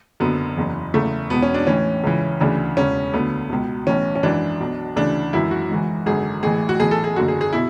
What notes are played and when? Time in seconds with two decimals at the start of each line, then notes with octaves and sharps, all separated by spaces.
0.20 F#1 F#2 D3 B3
0.57 F#1 E2 C#3 E3
0.94 F#1 E2 C#3 A3
1.30 E1 E2 B2 B3
1.42 C#4
1.54 D4
1.67 A1 A2 E3 C#4
2.04 C#2 C#3 E3
2.40 D2 C#3 E3 D4
2.77 E1 E2 C#3 C#4
3.14 D2 D3 B3
3.50 C#2 B2
3.87 B1 A2 E3 C#4
4.16 C#4
4.23 G#1 F#2 E3 D4
4.60 B1 B2
4.96 D2 C#3 E3 D4
5.33 G#1 F#2 E3 E4
5.51 F#4
5.70 G#1 G#2 E3
6.06 G#1 F#2 D3 G#4
6.43 A1 A2 E3 G#4
6.69 F#4
6.79 B1 A2 E3 G#4
6.91 A4
7.04 G#4
7.16 F#1 F#2 D3 F#4
7.28 G#4
7.41 G#4
7.53 B2 E4